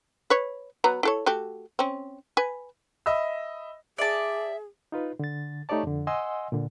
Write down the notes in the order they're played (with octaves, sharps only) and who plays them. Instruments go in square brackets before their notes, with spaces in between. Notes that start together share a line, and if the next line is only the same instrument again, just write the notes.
[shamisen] B4 C#5
F#3 B3 A#5
E4 A4 C#5
A3 F#4 G4
C4 C#4
B4 G#5
[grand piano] D#5 E5 B5 E6
[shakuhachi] G#4 [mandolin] D5 A5 [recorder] E5
[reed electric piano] D#4 F4 B4
D3 A6
A3 D#4 G4 C#5 D5 A5
F2 D3
D#5 F#5 G#5 C6 E6
A#2 D3